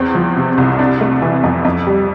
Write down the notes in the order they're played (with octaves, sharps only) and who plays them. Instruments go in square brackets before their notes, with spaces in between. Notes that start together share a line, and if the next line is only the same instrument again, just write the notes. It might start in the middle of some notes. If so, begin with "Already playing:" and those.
Already playing: [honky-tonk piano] E2 C4
F3
C3
C2
D4
A3
E3
F2
F2
G3